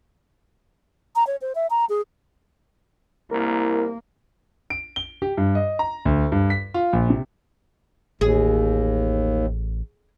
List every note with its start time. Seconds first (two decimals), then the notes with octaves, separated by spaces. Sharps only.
1.16 A#5
1.27 C#5
1.41 C5
1.55 E5
1.70 A#5
1.89 G#4
3.31 C2 A#3 E4 A#4
4.70 D7
4.96 G7
5.22 G4
5.37 G2
5.55 D#5
5.79 A#5
6.05 D2
6.32 G2
6.50 B6
6.74 F4
6.93 A#1
7.10 C3
8.21 A1 D#2 G#4